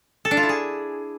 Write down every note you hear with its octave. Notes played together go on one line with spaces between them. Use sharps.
A4
D4
F4
E4
G#4